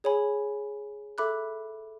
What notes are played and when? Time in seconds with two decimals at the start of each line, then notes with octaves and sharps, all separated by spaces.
0.04 G#4 C#5 G#5 B5
1.18 A4 E5 B5 D6 F#6